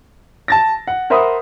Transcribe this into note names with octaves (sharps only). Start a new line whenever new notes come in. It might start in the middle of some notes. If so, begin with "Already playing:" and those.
A5 A6 A#6
F#5
A#4 C5 E5 F#5 B5 D#6